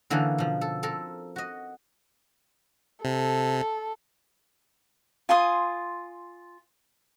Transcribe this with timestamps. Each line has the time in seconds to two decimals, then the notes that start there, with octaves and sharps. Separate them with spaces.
0.10 D3 E3 A#3 C#4 D#4 A4
0.38 B2 F3
0.61 A4
0.83 C4 A4 A#4
1.36 F#4 D#5
3.05 C3 A4
5.29 F4 G#5 C6 D#6